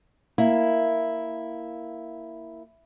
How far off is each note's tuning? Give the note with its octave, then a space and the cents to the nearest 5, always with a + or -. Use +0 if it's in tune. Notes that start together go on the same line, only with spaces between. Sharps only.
A#3 +0 E4 +0